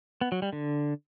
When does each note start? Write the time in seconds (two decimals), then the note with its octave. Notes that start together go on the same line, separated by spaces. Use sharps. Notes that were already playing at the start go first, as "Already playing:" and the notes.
0.21 B3
0.32 F#3
0.42 G3
0.53 D3